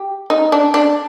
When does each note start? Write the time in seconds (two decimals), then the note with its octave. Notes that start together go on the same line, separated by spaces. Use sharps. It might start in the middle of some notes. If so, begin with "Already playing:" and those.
Already playing: G4
0.30 D#4
0.52 D4
0.74 D4